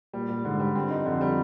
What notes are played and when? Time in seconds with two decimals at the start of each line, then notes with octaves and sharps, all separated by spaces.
0.13 A#2 G3
0.29 G3
0.45 G#2 D3
0.60 G3
0.75 G2 C4
0.90 D#4
1.06 F2 D3
1.21 G3